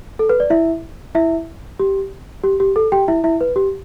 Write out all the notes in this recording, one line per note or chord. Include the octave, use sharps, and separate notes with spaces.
A4
B4
D5
E4 E5
E4 E5
G4
G4
G4
A4
G4 G5
E4 E5
E4 E5
B4
G4